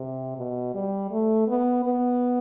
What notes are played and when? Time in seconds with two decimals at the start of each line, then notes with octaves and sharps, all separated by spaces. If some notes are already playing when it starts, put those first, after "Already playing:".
Already playing: C3
0.38 B2
0.74 G3
1.11 A3
1.48 B3
1.84 B3